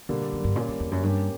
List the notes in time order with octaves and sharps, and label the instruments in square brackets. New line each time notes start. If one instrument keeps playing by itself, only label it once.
[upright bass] B2 [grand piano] D3 G3 A#3
[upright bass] A#2
F#2
G2
[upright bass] A#2 [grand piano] G3 A#3 C#4
[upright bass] E2
E2
F#2
[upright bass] G2 [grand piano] A#3 C#4 G4